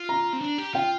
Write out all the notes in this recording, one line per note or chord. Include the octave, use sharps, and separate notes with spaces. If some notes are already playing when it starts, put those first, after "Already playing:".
Already playing: F4
A#5
C4
D4
G4
F4 G5